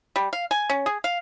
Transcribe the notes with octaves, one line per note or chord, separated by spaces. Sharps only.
G3
F5
G#5
C#4
G#4
F5